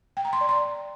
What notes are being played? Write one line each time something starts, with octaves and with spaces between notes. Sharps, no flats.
G5
A#5
C6
D5
C6